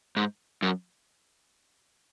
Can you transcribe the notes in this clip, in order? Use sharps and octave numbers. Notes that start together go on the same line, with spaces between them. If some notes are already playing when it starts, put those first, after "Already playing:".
G#2
F#2